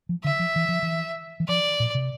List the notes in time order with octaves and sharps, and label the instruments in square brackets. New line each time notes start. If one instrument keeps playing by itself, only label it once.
[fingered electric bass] F3
[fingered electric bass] D3 [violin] E5
[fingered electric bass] F3
E3
F3
E3
E3
[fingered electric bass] F3 [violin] D5
[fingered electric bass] A#2
C3